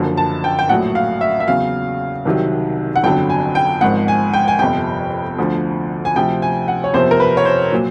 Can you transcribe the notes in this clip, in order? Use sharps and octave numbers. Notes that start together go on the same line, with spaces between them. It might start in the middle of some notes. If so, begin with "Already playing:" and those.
Already playing: F#1 F#2 D3 F3
A5
G5
G5
A#1 A2 F#3 F#5
F5
E5
E5
E2 C#3 F#3 F5
C2 C3 D#3 F#3
F#5
G1 F2 D3 F#3 G5
G#5
G5
G#1 G#2 F3 F#5
G#5
G5
G#5
G1 F2 C3 F3 G5
D2 D3 F3
G#5
D2 C3 F3 G5
G#5
F#5
C#5
F#1 E2 C3 F3 C5
A#4
B4
C#5
C5
A#2 F#3